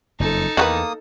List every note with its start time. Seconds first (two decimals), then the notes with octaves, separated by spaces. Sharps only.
0.20 F#1 F2 D#4 A4
0.57 E2 D#3 A#3 F#4 B4 D#6